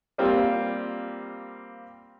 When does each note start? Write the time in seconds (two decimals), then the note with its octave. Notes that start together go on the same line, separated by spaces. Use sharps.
0.18 G3 A#3 C4 F4 G4